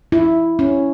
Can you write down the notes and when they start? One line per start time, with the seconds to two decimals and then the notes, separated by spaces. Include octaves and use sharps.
0.12 E4
0.59 C#4